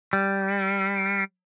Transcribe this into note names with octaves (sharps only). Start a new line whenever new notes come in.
G3